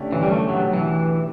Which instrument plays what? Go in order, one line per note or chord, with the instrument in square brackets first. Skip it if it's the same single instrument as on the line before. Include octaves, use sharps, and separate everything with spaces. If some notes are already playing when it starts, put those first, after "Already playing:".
Already playing: [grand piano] D3 A3 C#4 G4 D5
[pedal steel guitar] E3
G3
A3
[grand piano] B2 A3 D4 G4 [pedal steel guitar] F#3
[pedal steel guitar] E3